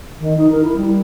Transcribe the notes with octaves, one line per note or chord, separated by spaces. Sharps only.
D#3
D#4
A#4
E4
G3